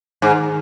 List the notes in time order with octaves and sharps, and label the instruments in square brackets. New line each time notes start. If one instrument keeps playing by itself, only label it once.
[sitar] G#2 [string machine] D#3